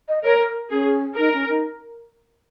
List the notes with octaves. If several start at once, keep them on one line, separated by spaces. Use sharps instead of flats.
D#5
A#4 C#5
A#4
C#4 G#4
D#4 A#4
C#4
D#4